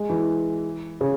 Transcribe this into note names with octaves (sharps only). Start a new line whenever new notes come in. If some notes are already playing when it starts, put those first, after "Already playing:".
Already playing: G#3
E3
C#3